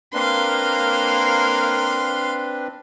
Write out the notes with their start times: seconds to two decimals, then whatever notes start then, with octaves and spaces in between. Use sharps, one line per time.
0.14 A#3 C4 D4 B4 F5 C6